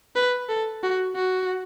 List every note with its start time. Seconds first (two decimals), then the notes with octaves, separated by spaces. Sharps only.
0.16 B4
0.49 A4
0.83 F#4
1.16 F#4